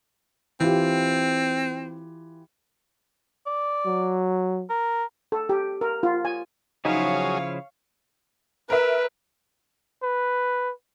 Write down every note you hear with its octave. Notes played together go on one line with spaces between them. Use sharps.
E3 C4 F4 G4
D5
F#3
A#4
A4
G4
A#4
F4
G#5
C#3 F3 F#3 D#4 E4 G#4 C#5 F5
A#4 B4 E5
B4